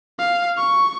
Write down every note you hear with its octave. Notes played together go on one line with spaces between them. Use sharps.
F5
C#6